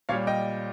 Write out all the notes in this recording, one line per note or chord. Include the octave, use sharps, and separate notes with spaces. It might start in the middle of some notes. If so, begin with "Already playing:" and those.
A#2 G3 C#5 F5
D#5 G5